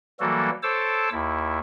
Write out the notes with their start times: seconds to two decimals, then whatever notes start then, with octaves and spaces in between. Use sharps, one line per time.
0.20 E3 F#3 G3 A#3 F#4 A4
0.63 A4 C5 C#5 A5 D6 E6
1.12 D#2 E4